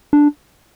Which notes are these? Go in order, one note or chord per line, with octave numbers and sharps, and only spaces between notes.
D4